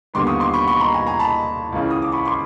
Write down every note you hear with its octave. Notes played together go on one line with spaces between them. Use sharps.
D#2 D3 G3 B3 C6 D6
C#6 D#6
C6 D6
B5 C#6
B5 C#6
A#5 C6
G#5 A#5
G#5 A#5
A5 B5
C#2 C#3 E3
D#6
D6
B5 C#6
C6 D6